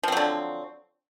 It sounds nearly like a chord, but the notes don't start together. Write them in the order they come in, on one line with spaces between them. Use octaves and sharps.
F3 C4 F#3 D3